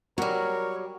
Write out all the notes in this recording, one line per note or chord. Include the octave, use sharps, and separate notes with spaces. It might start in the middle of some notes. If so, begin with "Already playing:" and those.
F#3 G3 F#4 A#4 C#5